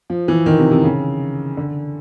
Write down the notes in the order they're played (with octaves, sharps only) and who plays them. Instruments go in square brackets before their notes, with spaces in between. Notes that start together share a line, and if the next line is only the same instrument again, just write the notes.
[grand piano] F3
E3
D#3
C3
C3
C#3
D3